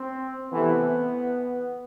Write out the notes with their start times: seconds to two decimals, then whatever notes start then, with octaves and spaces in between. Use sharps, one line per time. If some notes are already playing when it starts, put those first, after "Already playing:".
Already playing: C4
0.52 C3 E3 A3 B3